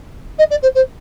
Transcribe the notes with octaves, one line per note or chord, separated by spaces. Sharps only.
D#5
D5
C5
C5